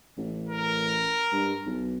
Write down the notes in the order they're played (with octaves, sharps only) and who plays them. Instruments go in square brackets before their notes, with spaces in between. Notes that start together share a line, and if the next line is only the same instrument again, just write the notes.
[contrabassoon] A1
[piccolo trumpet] A#4
[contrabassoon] G2
B1